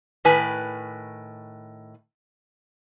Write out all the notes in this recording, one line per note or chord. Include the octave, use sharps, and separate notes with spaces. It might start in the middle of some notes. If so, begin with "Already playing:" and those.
A2 D#3 B4 G#5